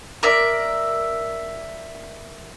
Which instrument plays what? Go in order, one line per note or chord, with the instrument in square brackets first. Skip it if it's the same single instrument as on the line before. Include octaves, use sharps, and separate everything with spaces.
[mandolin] A#4 D5 E5